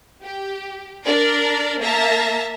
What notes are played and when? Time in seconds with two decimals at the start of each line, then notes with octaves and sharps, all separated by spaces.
0.23 G4
1.04 D4 A#4 D5
1.80 A#3 E5 A5 A#5 A#6